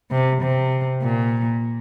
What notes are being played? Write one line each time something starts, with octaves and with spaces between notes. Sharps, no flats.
C3
C3
A#2